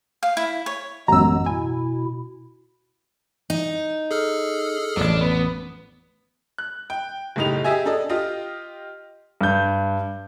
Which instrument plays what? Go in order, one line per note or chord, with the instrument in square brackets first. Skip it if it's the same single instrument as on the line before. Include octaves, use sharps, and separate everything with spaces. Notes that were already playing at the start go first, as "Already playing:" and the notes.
[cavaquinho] F5
E4
C#5
[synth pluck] A1 F#2 [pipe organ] G#3 B3 [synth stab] A#5 E6
[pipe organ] B2 E4 [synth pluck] G#5
[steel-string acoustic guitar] D#4
[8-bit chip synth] G#4 A4 F6
[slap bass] A1 F2 [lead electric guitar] D4
[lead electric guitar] B3
[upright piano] F#6
G5
F#1 A2 D#4 G4 F7
G4 G#4 D#5 E5 G#5
D4 A4 D#5
F4 G4 D#5
[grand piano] G2 G6